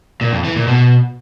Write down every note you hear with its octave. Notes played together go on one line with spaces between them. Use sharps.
A#2
F2
E3
A#2
B2